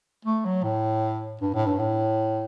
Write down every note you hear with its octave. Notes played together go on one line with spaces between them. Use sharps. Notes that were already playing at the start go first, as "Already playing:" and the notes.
A3
F#3
A2
G2
A2
G2
A2